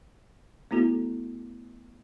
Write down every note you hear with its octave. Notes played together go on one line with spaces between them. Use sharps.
A3 B3 E4 F#4 A4